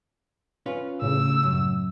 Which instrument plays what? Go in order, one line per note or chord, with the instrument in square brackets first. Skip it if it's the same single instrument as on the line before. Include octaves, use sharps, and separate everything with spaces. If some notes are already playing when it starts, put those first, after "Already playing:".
[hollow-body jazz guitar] C#4 F4 B4
[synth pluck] A2 C#3 [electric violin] E6
[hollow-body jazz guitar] F#2